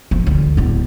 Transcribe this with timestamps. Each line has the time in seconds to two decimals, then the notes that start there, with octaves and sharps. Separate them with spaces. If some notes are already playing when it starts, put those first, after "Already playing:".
0.11 F3
0.26 D2
0.57 D1 B3